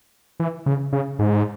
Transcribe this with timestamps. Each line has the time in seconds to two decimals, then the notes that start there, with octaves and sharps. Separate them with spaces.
0.40 E3
0.66 C#3
0.93 C#3
1.19 G#2